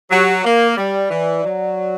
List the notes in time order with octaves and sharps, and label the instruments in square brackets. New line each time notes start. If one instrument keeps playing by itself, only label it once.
[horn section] F#3 [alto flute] G4
[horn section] A#3 [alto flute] A#4
[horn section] G3 [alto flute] D5
[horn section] E3
F#3